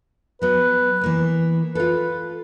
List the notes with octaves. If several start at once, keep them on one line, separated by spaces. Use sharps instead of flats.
F#3 B3 B4
E3 A#3 B3
F4 A4 B4